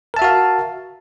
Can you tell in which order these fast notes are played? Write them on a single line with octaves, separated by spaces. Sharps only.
A#4 A5 E5 F#4 F5